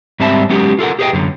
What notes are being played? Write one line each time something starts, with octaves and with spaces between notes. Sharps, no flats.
G#2 G3 C4 E5 A5 B5
F#3 G#3 B3 C#4 G4
F4 A4 A#4 F#5
G4 G#4 B4 C5 D#5 G5
F#2 D3